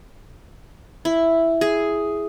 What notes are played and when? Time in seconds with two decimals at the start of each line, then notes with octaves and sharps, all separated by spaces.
1.05 E4
1.61 G#4